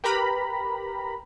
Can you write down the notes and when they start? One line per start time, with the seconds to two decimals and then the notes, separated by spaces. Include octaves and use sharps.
0.04 G4 A#4 B4 A#5 B5